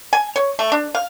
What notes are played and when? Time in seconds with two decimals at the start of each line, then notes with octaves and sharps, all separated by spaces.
0.13 G#5
0.36 C#5
0.59 A3
0.72 D4
0.95 F5